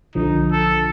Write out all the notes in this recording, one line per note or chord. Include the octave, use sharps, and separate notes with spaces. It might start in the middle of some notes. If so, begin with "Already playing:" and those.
B1 D3 F3 D#4
A4